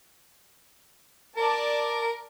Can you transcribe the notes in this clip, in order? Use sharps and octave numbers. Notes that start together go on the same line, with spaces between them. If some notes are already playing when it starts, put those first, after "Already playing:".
A#4 D5 A5